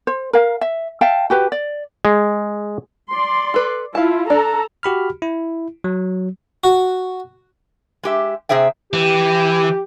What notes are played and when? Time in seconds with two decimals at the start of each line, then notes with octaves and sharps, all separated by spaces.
0.07 C5
0.33 A#4 F5
0.61 E5
1.01 E5 F5 G5 A5
1.30 F#4 G4 B4
1.52 D5
2.05 G#3
3.09 D5 C6
3.54 A4 B4
3.95 E4 F4 F5 A5
4.30 D4 A4 D5 A#5
4.83 F#4 G4 B5 F6
5.22 E4
5.84 F#3
6.64 F#4
8.03 G#3 G4 E5
8.49 C3 G#4 C5 E5 G5
8.93 E3 G4